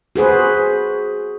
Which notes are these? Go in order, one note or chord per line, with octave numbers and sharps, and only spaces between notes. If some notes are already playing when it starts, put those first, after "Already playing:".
F#4 G#4 B4 C5